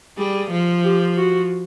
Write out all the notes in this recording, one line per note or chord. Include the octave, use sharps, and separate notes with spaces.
G3 G#4
F3
G4
F#4